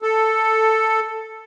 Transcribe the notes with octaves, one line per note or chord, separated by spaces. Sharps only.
A4